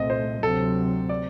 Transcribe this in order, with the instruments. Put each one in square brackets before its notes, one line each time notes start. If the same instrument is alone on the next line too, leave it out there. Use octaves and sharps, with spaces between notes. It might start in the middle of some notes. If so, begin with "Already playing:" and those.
Already playing: [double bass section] C2 A#2 A3 C4 [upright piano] D#5
[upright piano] C5
[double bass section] D2 C3 F#3 C4 [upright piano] A4
[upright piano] D5